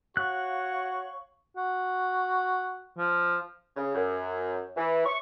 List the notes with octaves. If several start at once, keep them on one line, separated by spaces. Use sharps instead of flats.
F#4 C#5 F5 C#6 F#6
F#4
F3
C#3
F#2
E3
C#6